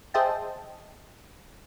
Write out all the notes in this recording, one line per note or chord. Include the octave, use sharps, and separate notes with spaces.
G#4 C5 D#5 E5 G5 A5